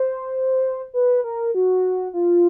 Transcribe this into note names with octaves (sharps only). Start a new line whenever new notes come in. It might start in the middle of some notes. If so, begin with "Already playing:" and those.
Already playing: C5
B4
A#4
F#4
F4